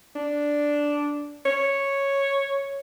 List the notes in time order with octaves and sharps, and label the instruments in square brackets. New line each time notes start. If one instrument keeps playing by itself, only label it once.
[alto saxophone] D4
C#5